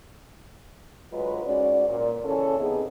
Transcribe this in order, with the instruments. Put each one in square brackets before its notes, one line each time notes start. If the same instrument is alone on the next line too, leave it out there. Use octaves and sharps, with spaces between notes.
[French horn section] D2 F#3 G#3 F4 B4
G#2 C#4 F#4 D5
A#2
C#3 E3 C#4 A4
C3 B3 D#4 G#4